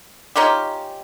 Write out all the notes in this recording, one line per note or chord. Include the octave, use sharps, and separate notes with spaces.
C#4 D#4 F4 G4